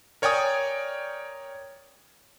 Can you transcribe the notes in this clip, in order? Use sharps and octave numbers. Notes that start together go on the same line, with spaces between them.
A#4 C#5 D5 G5 G#5 D#6